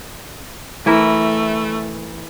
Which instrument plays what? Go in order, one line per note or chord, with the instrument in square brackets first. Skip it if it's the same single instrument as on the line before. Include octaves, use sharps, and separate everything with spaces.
[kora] E3 E4 A#4 [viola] A3